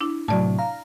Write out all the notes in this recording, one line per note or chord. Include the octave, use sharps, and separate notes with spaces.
D4 E4
A2 C3 F#3 D5 A5
F5 A#5